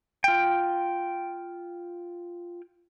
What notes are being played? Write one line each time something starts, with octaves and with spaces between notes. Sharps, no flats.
F4 G5